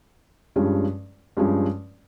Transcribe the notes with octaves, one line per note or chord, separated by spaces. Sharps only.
G2 F3 G#3 C#4 G4
G2 F3 G#3 C#4 G4